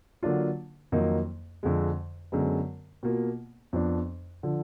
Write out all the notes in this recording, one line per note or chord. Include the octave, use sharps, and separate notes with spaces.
D3 F#3 A#3 D4 F4
F2 D#3 F#3 A#3 D#4
F2 D3 G#3
F#2 D3 G#3 B3
B2 A#3 F4
F2 F3 B3 D4
D3 F3